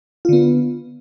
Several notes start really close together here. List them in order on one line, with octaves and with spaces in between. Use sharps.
F4 D3 B3